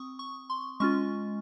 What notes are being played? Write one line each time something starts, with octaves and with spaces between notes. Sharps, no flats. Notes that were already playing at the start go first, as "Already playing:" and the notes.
Already playing: C4 C#6 D#6
C#6
C6
G#3 C#4 F4 C#6